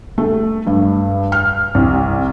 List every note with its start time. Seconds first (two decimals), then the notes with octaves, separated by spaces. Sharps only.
0.18 A3
0.67 G2
1.32 F6
1.75 C2